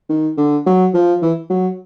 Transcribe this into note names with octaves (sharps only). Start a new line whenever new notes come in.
D#3
D3
F#3
F3
E3
F#3